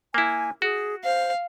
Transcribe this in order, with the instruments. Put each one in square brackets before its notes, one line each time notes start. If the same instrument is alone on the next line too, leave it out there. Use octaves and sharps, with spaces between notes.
[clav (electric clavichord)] A#3 E4 [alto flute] G#5
[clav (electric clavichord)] F#4 [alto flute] G#4
[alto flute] C5 [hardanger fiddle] F5